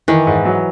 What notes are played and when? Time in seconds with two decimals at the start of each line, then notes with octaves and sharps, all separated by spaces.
0.08 D#3 E3
0.27 G#2
0.45 F#3